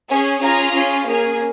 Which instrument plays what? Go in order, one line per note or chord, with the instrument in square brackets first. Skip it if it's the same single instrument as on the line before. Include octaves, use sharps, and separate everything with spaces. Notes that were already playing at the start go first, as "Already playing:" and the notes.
[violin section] C#4 G#4
C#4 F4 G#4 A#5
C#4 F4 G#4
A#3 C#4 G#4